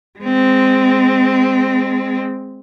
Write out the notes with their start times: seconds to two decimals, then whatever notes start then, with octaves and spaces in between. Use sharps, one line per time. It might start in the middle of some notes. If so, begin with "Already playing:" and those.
0.20 G#3 C4